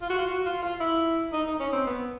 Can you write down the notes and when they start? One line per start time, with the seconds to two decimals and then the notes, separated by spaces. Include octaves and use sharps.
0.02 F4
0.10 F#4
0.18 F4
0.28 F#4
0.45 F4
0.62 F4
0.80 E4
1.33 D#4
1.47 D#4
1.59 C#4
1.73 C4
1.86 B3